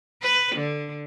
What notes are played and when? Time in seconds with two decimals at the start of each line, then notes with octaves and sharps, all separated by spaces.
0.22 B4
0.55 D3